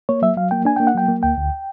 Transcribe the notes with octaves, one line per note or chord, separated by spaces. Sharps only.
A#3 C#5
F#3 E5
F#3 F5
A#3 G5
D4 G#5
A#3 G5
F#5
F#3 G5
A#3
D2 G5
D2